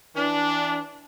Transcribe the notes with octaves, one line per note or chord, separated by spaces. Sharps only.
E3 D4